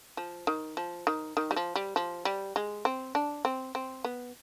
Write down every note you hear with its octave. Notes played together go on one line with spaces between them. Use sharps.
F3
D#3
F3
D#3
D#3
G3
F3
G3
F3
G3
G#3
C4
D4
C4
C4
B3